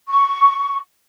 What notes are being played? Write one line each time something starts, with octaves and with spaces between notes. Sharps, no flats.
C#6